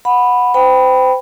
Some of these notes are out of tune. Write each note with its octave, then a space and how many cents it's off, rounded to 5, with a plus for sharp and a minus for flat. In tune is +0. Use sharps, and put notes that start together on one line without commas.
F#5 -15 B5 +0
C5 -35 G5 +0 B5 +0